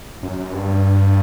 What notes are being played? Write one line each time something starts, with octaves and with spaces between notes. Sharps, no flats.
F#2
G2